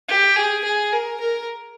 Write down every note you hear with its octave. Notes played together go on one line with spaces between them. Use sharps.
G4
G#4
G#4
A#4
A#4